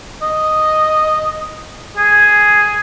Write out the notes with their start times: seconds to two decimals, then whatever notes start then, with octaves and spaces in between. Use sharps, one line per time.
0.22 D#5
1.97 G#4